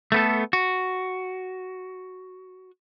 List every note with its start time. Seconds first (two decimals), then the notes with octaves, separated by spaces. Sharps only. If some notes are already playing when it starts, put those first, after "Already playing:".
0.12 A3 B3 A4
0.53 F#4